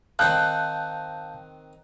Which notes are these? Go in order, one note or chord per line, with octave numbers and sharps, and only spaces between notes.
D#3 C4 D#4 F5 A5 F#6 G6